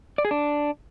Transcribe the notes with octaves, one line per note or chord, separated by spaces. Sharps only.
D5
G#4
D4